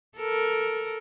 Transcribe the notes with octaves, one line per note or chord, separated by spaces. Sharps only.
A4 A#4